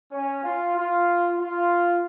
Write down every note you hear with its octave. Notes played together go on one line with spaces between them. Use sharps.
C#4
F4
F4
F4